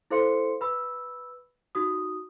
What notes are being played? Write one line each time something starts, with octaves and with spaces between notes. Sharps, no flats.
E4 A4 C5 F5 C6 C#7
B4 B5 E6
D#4 F#4 D#6